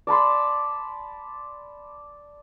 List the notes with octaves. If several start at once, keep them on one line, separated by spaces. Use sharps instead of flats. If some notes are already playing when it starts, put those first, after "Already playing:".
D5 A5 B5 C6